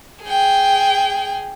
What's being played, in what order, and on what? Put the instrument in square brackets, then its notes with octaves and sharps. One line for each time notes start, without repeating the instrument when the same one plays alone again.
[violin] G#4 G5